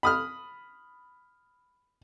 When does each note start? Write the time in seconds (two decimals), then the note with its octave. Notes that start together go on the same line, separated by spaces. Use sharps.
0.03 B5 D#6 F6